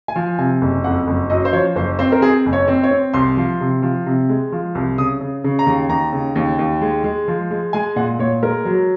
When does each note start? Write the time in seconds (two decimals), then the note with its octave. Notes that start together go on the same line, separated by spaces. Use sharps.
0.08 G#5
0.16 F3
0.38 C3 G#5
0.61 F#1
0.84 F2 F#5
1.07 F#1
1.30 F#2 D#5
1.45 C5
1.53 F3 C#5
1.76 F#1 C5
1.99 C4 C5
2.12 A#4
2.22 C4 G#4
2.46 F#1
2.53 C#5
2.68 C4
2.83 C#5
2.91 C4
3.14 C2 C6
3.37 F3
3.60 C3
3.82 F3
4.06 C3
4.29 G#3
4.52 F3
4.75 C2
4.98 C#3 D#6
5.21 C#3
5.44 C#3
5.59 A#5
5.66 D#2
5.89 D#2 A#5
6.13 C#3
6.35 D#2
6.59 D#2
6.81 G#3
7.04 G#3
7.28 F3
7.51 G#3
7.73 G#3 G#5
7.96 A#2 F#5
8.19 A#2 C#5
8.42 G#3 A#4
8.65 F#3